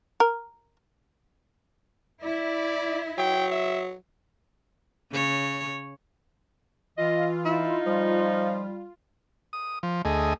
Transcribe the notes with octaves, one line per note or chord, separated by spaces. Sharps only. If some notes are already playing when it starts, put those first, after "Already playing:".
A#4
E4 D5
F#3 G5
E5
C#3 C#5
E3 F4 D#5
D#4 E4
F3 G3
D#6
F3
D2 A3 G#4 D#5